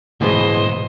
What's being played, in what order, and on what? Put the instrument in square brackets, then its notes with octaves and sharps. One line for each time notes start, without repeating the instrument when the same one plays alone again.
[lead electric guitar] D2 G#2 [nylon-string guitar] B2 E3 G#3 [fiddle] C5 D#5